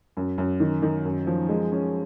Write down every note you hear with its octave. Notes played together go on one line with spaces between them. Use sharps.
F#2
F#2
D#3
D#3
F#2
F3
G#3
C#4